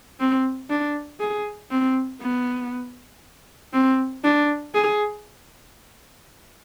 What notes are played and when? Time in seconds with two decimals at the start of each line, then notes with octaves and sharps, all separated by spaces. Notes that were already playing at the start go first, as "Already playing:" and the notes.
0.20 C4
0.70 D4
1.20 G#4
1.71 C4
2.21 B3
3.73 C4
4.24 D4
4.74 G#4